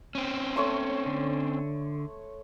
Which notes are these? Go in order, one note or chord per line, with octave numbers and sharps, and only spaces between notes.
C4 C#4
A3 C#5 C6
D3